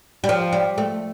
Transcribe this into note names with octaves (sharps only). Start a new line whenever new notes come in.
G3
F3
G3
A3